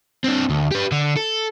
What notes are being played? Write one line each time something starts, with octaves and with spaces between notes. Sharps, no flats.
C4 D4
D2
G4 B4
D3
A4